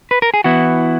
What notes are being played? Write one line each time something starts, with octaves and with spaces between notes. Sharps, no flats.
B4
A#4
G#4
E3 B3 E4 F#4